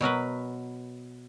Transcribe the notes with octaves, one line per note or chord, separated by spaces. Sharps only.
B2 F#3 A#4 B4